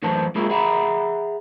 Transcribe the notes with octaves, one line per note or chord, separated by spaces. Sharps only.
F#2 A2 E3 B4 C5 A5
G#3 A#3 E4 F4 G#4 A#4
G#4 E5 F#5 A#5 B5